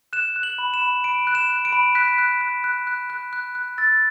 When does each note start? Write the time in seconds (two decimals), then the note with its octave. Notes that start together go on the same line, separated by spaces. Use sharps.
0.13 F#6 E7
0.36 F#6
0.43 F#7
0.58 B5
0.74 E7
0.82 B5
1.04 B5 D7
1.27 F#6
1.35 E7
1.50 F#6
1.65 D7
1.73 B5
1.95 F#6 B6
2.18 F#6
2.41 F#6
2.64 F#6
2.87 F#6
3.10 F#6
3.33 F#6
3.55 F#6
3.78 E6 A6